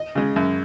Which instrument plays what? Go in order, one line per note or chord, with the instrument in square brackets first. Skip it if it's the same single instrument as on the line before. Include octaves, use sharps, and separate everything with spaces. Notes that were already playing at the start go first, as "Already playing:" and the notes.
Already playing: [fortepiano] D#5
C#3 G#3
F#2